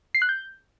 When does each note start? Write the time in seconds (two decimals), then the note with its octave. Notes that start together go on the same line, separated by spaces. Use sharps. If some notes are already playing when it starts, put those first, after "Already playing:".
0.15 C7
0.22 F#6
0.29 G6